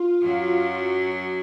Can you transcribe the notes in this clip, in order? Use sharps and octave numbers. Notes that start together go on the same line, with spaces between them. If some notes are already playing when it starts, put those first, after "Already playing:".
Already playing: F4
F#2 F#3